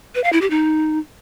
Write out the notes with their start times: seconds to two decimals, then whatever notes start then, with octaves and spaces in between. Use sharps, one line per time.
0.15 B4
0.24 F5
0.33 E4
0.41 G4
0.50 D#4